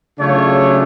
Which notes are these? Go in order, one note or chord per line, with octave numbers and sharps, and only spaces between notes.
C#3 F#3 A3 D4 F4 C#5